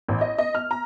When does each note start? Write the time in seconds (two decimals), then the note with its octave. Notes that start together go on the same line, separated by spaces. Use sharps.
0.09 A1
0.21 D#5
0.38 D#5
0.55 F6
0.71 A#5